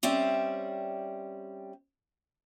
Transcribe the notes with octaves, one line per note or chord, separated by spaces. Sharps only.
G3 C4 C#4 D5 E5